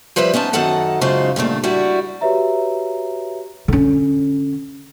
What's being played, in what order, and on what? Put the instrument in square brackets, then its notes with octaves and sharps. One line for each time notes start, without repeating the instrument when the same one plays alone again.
[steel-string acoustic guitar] F3 G3 B4 C5 E5
B3 C#4 D#4 A5
F#2 D#3 D#4 A4 F#5 A5
F#2 C#3 G#3 D#4 F4 C5
G2 A#2 C#3 A3
G3 E4 F#4
[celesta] F#4 G4 B4 C#5 E5 A#5
[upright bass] D3 C#4